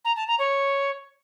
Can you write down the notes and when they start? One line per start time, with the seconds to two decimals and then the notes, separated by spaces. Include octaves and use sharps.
0.05 A#5
0.16 A5
0.27 A#5
0.39 C#5